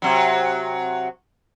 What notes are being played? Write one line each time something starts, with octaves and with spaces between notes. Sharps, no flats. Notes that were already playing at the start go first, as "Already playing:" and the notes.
C3 F#3